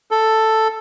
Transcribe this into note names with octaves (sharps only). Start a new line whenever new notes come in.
A4